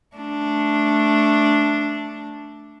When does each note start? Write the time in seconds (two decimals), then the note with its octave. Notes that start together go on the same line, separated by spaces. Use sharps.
0.16 A3 D4